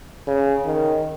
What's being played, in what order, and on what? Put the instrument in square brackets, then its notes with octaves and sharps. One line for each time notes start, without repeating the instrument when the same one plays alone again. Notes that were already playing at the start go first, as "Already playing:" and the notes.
[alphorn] C#3
D#3